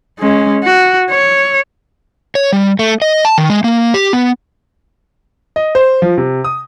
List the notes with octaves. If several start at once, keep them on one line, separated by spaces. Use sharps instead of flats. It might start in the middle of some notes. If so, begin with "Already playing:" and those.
G#3 C#4
F#4
C#5
C#5
G3
A3
D#5
A5
D#3
G#3
A#3
G4
B3
D#5
C5
F3
C3
D#6